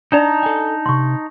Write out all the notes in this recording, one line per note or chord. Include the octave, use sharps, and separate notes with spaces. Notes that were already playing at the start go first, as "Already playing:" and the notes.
D4 D#4 D5 A5 A#5
A4 G#5
C2 C3 C6 C#6